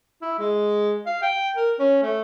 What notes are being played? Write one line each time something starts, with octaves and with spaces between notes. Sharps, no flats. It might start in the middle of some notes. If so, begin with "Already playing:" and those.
E4
G#3
F5
G5
A#4
C#4
A3